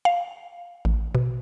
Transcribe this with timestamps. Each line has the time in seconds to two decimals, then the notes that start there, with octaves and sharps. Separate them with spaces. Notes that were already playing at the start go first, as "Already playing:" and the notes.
0.05 F5
0.85 A1
1.15 B2